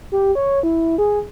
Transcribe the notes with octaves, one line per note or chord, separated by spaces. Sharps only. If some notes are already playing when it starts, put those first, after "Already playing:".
G4
C#5
E4
G#4